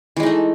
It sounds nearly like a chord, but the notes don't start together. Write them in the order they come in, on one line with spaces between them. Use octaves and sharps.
E3 G#3 D#4 A3